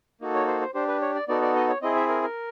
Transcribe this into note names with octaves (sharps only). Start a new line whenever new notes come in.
A#3 D#4 F#4 A4
C#5
C5
C5
D4 G4 C5
B4
C#5
D5
B3 D#4 F#4 A4 D5
D5
D#5
C#5
C4 E4 G#4 D#5
E5
A#4
A#4